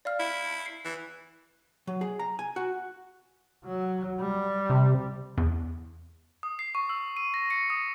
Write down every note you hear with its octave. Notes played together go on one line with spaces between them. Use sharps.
D5 F5 F6
E4
C7
E3
F#3
G#4
A#5
G#5
F#4
F#3
G3
C3
E2
D#6
C7
C#6
E6
D#7
A#6
C#7
D#6